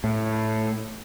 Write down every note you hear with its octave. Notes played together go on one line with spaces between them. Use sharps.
A2